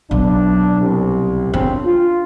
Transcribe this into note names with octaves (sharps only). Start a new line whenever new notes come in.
B1 D4
C2
F#2 C#3 C4 D4
F4